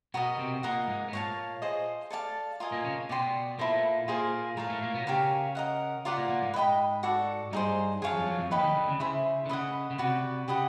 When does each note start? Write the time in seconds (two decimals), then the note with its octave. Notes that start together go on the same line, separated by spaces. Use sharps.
0.14 B2 B3 F#4 A#4 D#5
0.39 C3 C4
0.63 A#2 A#3 A#4 D#5 F#5
0.88 G#2 G#3
1.08 B3
1.12 A#2 A#3 C#5 F5 A5
1.62 F4 G#4 C5 D#5
2.10 A4 D5 F5 A5
2.60 F4 A#4 D#5 G#5
2.72 A#2 A#3
2.85 C#3 C#4
3.09 B2 B3 D5 G5 C6
3.58 A#2 A#3 E4 A4 C5
4.08 A#2 A#3 F4 G#4 C5 F5
4.57 A2 A3 A#4 C#5 F5
4.70 A2 A3
4.82 A#2 A#3
4.94 B2 B3
5.07 C#3 C#4 G4 A#4 C#5 F5
5.55 A#4 D#5 F#5
6.05 B3 F4 A#4 D5 F#5
6.17 A#2 A#3
6.29 A#2 A#3
6.42 G#2 G#3
6.54 B4
6.56 D#5 G5 B5
7.03 F#4 A4 D5
7.52 G2 G3 D#4 G#4 C5
8.02 F#2 F#3 G#4 C#5 F5 A5
8.14 F2 F3
8.26 F#2 F#3
8.39 F2 F3
8.51 D#2 D#3 B4 D#5 G5 B5
8.59 E3
8.63 D#2 D#3
8.75 D2 D3
8.88 C#3
9.00 C#3 E4 G#4 C5 E5
9.46 D3
9.49 C#3 B4 D#5 F#5
9.91 C#3
9.98 C3 F#4 B4 D5
10.48 C#3 G4 B4 D#5 F#5